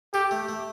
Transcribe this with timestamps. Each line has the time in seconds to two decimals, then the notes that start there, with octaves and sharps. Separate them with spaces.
0.13 G4 A4
0.31 A3
0.49 A3